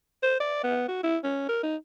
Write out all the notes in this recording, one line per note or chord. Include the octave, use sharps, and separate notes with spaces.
C5
D5
B3
F#4
E4
C#4
A#4
D#4